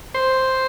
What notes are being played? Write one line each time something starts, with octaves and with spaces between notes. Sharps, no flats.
C5